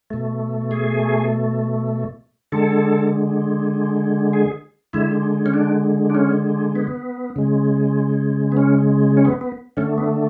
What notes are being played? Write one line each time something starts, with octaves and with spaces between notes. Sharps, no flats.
B2 A3
G#4
D3 G#3 A4
G#4
D3 G#3 E4
C#4
D4
D4
C#4
B3
C#3 G#3
B3
C#4
C#4
B3
B3
D3 A3 C#4
B3